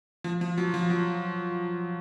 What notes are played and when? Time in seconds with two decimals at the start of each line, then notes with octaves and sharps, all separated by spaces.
0.24 F3
0.41 F3
0.58 F#3
0.74 F3
0.90 F#3